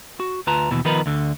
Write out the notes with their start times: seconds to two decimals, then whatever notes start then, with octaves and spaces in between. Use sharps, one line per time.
0.20 F#4
0.47 D2 F4 B4 A5 A#5
0.71 D#2 B2 E3
0.85 D#3 F3 B3 D#4 A#4 B4
1.06 D2 D3